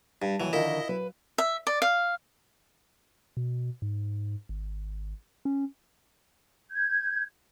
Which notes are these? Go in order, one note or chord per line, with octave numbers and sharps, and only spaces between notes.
G2 G5 A5
D#2 E3 F#3 G#5
D3 D#3 F3 E4 A#4 D#5 F5 G5
F#3 B4
E5
D5
F5
B2
G#2
G#1
C#4
G6 G#6